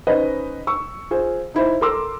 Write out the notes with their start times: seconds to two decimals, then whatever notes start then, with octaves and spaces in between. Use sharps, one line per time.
0.07 C#4 D#4 B4 C5 D#5
0.67 C#6 E6
1.11 F4 G#4 C5
1.54 D#4 E4 C5
1.81 A4 A#4 C6 D6 E6